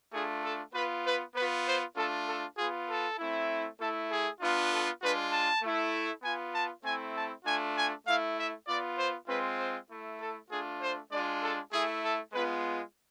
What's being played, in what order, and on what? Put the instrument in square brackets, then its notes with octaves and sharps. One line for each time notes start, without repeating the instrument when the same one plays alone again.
[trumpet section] A3 D4 F4 G#4
A4
B3 F4 B4
B4
B3 F4 B4
C5
A3 D4 F4 A4
A4
B3 F4 G#4
A4
A3 C4 E4
A3 E4 A4
G#4
B3 D4 F4
A4
G#3 D4 F4 B4
A5
A3 E4
B3 F4 G#5
A5
A3 C4 E4 G#5
A5
A3 D4 F4 G#5
G#5
A3 E4 F5
E5
B3 F4 D5
C5
G#3 C4 F4 B4
C5
A3 E4
A4
A3 D4 F4 G#4
C5
G#3 D4 F4 D5
A4
A3 E4 G#4
A4
G#3 B3 F4 B4